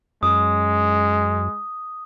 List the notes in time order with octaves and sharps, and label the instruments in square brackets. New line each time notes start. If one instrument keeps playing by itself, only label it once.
[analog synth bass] F#2 [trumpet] G#3 [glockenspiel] D#6